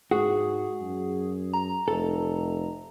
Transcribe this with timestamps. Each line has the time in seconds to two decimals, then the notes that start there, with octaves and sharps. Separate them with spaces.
0.11 G#2 F#4 G#4
0.81 F#2
1.54 A#5
1.88 F1 A4